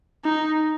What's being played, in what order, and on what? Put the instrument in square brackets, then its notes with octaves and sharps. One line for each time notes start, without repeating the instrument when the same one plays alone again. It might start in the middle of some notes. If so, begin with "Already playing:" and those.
[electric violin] D#4